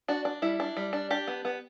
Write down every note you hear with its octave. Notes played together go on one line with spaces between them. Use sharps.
D4 F#4
D4
G3 E4
D4
G3
D4
D4 G4
B3
B3